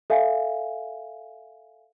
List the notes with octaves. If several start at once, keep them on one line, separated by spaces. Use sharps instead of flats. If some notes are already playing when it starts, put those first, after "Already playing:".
A4 E5 F5 G#5